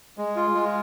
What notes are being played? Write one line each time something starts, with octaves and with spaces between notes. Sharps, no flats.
G#3
F4
G#3